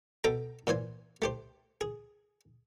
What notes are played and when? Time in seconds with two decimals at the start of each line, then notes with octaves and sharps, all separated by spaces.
0.24 B2 A4 G5 A#5
0.67 A#2 E3 C5 G#5
1.22 A3 G4 C5
1.81 G#4